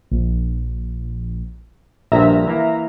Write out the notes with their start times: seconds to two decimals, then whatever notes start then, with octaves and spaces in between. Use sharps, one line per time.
0.11 A#1
2.12 A#1 G2 F3 E5 A#5
2.48 E3 A#3